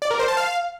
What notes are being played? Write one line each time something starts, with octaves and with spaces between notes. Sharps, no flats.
D5
A#4
C5
A5
F5